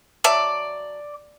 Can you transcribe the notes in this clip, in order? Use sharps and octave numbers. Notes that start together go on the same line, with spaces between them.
F#3 D5 E5 A5